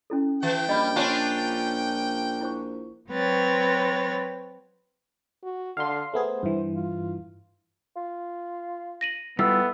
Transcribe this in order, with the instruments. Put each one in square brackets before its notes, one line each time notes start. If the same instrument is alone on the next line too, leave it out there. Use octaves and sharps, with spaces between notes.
[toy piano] C#4 E4 A4
[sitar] E3 [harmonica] G5
[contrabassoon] A#1 [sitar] G3 [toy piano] D#5 B5
[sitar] C#4 D4 F4
[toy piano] E4 C5 C#6
[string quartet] F#3 C4 B4 C#5 A6
[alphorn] F#4
[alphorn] D3 [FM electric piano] F5 C6
[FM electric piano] A3 B3 G#4 [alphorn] C5
[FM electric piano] G2 E3
[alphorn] F4
[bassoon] F4
[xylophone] A#6 D#7 F#7
[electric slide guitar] G3 E4 F4 [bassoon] A3 [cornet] B3 [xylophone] E6